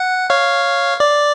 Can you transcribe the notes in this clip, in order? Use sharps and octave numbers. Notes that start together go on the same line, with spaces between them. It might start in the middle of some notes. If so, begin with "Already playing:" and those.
Already playing: F#5
C#5 F5
D5